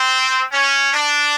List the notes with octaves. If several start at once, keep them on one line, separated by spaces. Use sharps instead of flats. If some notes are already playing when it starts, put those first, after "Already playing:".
Already playing: C4
C#4
D4